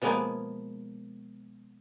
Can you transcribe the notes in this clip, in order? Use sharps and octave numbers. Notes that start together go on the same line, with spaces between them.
B2 F3 G#3 A#3 B3 G#5